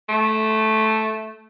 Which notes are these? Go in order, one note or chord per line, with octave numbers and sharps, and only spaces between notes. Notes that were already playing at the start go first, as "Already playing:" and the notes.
A3